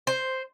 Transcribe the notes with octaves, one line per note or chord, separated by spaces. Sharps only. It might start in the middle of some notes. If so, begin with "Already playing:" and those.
C5